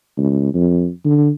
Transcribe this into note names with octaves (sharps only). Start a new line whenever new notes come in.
C#2
F2
D3